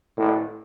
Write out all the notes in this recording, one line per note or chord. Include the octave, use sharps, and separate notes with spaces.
A2